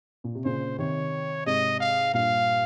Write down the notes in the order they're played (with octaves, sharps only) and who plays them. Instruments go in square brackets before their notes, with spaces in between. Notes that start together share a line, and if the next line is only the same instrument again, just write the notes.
[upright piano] A#2
C3
[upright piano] A#2 C#3 [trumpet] C5
[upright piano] C3 D#3 [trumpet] C#5
[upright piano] G#2 C3 [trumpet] D#5
[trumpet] F5
[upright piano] G2 A#2 [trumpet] F5